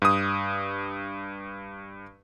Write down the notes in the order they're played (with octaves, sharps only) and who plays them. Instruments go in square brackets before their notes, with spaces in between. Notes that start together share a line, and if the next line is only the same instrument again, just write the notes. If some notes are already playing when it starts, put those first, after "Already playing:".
[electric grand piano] G2 D#6